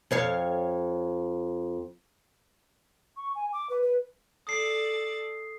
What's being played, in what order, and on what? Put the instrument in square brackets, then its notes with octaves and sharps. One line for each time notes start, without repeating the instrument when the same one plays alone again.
[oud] F2 C#5 F5
[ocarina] C#6
G#5
D6
B4
B4
[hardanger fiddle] A4 D5 [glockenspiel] D#6 C7